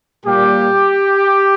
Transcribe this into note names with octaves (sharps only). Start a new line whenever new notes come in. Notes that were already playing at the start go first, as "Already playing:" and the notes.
A#2 G3 A#3 G4